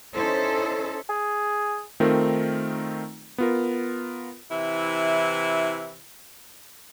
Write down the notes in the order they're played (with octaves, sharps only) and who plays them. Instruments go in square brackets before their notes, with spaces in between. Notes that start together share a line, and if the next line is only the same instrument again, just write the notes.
[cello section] C#4 D#4 E4 A4 C5
[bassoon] G#4
[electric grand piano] D#3 A3 C4 D#4 F4 A#4
B3 F4 A#4
[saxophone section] C3 E3 E4